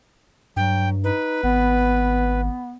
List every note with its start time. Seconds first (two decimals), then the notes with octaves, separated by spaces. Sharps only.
0.56 G2 F#3 G5
1.04 D#4 B4
1.43 G#1 B3